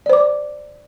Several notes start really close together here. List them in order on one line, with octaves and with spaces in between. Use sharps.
D5 C5 D6